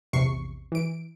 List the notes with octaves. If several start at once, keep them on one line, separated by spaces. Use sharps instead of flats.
A#1 E2 C3 C#6 C7
E3 D7